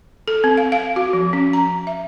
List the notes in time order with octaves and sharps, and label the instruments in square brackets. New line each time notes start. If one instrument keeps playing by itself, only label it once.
[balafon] A4
C4
F5
F5
F#4
F3
C#4
A#5
E5